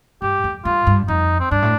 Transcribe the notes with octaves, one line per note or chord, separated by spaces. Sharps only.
G2 G4
F2
G2 F4
G2
F2 D#4
C4
G2 D4
A2